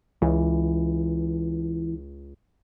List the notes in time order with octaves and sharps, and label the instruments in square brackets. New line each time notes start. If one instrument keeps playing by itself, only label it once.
[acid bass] C#2 [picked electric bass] E3